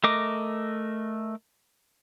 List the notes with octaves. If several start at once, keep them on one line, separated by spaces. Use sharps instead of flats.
A3 A#4 D#5 D6